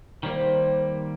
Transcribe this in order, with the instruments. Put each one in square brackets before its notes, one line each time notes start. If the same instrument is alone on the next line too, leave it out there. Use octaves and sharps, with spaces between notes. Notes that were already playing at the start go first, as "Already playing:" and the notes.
[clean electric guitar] D#3 G3 A#3 [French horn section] G4 A#4 C5